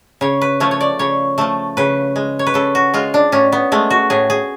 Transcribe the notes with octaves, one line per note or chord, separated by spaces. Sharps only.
C#3 C#5
B4
F3 A3 C#5
C#5
D5
C#3 C#5
F3 A3 A4
C#3 B4
G#3
C#5
B4
C#3 A4
F#4
G#3 F4
D4
A2 C#4
B3
G#3 A3
F#4
A2 G#4
G#4